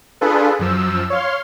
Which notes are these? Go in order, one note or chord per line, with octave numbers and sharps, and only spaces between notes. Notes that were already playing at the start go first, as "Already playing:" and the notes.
D4 F4 G#4 A4 B4
F#2 F3 E6
C#5 F5 C6